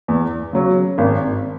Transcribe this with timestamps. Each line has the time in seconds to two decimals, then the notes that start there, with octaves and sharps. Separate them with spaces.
0.08 E2
0.53 C#3 F#3
0.98 G#1